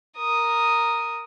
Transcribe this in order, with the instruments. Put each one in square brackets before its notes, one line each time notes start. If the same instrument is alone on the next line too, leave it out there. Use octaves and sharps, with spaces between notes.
[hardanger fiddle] A#4 D#6